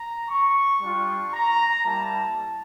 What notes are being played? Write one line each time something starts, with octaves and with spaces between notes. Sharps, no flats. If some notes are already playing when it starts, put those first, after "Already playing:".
Already playing: A#5
C#6
G3 D4 F4 C#6
A#5
G3 A#3 E4 A5